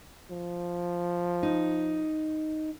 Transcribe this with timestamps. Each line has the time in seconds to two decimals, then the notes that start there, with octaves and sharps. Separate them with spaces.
0.30 F3
1.43 D#4